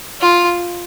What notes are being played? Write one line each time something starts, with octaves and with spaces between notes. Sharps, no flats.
F4